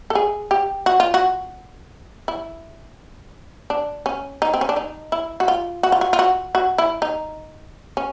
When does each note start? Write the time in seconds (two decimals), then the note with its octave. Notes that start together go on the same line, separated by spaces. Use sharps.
0.10 A4
0.15 G#4
0.51 G4
0.86 F#4
1.00 F4
1.14 F#4
2.28 E4
3.70 D4
4.06 C#4
4.42 D#4
4.54 C4
4.61 C#4
4.69 D4
4.76 D#4
5.12 E4
5.40 F#4
5.48 F4
5.83 F#4
5.92 F4
6.01 F#4
6.13 F4
6.19 F#4
6.55 F#4
6.78 E4
7.02 D#4
7.97 C#4